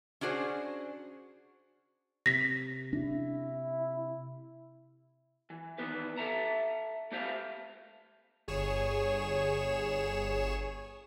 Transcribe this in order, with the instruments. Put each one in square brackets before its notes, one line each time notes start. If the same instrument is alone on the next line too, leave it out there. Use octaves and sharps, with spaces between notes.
[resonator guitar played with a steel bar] C#4 D4 F#4 G#4 C5
[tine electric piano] C3 [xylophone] A#6 B6
[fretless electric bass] D4 [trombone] E4
[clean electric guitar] E3
D#3 E3 B3 B4
A4 E5 A5 A#5
A3 G4 C5 E5 F5
[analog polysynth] G1 G#4 C#5 E7